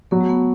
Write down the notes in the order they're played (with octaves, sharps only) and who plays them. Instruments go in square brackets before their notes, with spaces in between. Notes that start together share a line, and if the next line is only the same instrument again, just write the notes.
[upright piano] F#3 [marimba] B3
[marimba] A3
B3